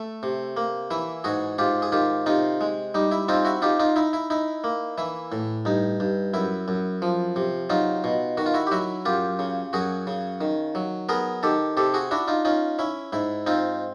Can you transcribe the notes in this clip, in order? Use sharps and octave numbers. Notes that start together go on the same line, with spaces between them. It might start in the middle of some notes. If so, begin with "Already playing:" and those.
Already playing: A3
C3
A#3
E3 E4
G#2 F#4 G#4
G#2 F4 G4
G#4
D#3 F4 G4
C3 D#4 F4
G#3
G3 D#4
E4
C4 D#4 F4
E4 F#4
D#4 F4 G4
D#4 F4
D#4 E4
E4
D#4 E4
A#3
E3 E4
A2
G2 D#4
G2
F#2 E4
F#2
F3
C3
F#3 D#4 F4
B2
D#3 F#4
F4
E4 F#4
G4
F#3 E4 F#4
F#2 F4 G4
C#3
F#2 F#4 G#4
C#3
D#3
F#3
B3 G#4 A#4
D#3 G4 A4
C3 G4 A4
F#4 G#4
D4 E4 F#4
D#4 F4
C#4 D#4 F4
C#4 E4
G#2 E4
C4 D#4 F4